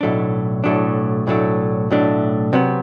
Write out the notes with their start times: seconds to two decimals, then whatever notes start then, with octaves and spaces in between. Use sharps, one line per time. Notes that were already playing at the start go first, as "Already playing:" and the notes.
0.01 B1 A2 F#3 A3 D4
0.64 B1 A2 F#3 A3 D4
1.27 B1 A2 F#3 A3 D4
1.90 B1 A2 F#3 A3 D4
2.53 C3 F#3 B3